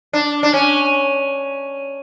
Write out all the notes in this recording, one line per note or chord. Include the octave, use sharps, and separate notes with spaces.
D4
D4
C#4